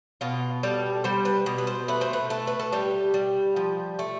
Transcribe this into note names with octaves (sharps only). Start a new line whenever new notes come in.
B2 F4
G3 A4
G3 C5
B4
B2
B4
C5
A3 B4
C5
B4
A3 A4
B4
A4
G3 G4
G3
F3
A3